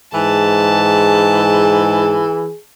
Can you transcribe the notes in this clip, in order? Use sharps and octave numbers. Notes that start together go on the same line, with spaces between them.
G#2 E3 G#4 A5